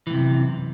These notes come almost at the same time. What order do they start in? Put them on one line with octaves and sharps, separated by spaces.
E3 A2 C3 F#2